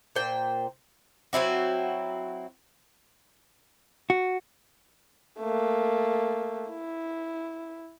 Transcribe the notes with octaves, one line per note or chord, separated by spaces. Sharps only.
A#2 C5 G5
F#3 C4 E4 F#4
F#4
A3 A#3
E4